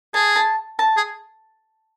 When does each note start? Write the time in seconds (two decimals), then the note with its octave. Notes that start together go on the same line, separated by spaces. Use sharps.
0.14 G#4 A5
0.36 A5
0.79 A5
0.97 G#4